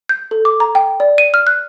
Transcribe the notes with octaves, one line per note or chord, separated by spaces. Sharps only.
G6
A4
D6
A#5
G5
D5
D#7
F6
F#6